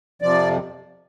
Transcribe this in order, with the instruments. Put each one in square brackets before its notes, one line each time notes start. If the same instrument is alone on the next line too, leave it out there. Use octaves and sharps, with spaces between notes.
[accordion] F2 C3 F3 D5